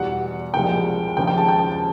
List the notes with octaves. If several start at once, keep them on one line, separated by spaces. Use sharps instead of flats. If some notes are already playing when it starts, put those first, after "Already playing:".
Already playing: E2 B2 G3 F#5
C2 A#2 F3 G#3 G5
D#2 C#3 F3 G#3 G5
G5
A5
G5